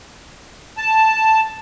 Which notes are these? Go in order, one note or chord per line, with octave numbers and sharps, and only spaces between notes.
A5